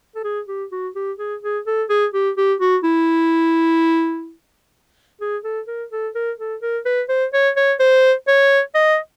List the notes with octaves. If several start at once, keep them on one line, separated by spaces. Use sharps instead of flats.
A4
G#4
G4
F#4
G4
G#4
G#4
A4
G#4
G4
G4
F#4
E4
G#4
A4
A#4
A4
A#4
A4
A#4
B4
C5
C#5
C#5
C5
C#5
D#5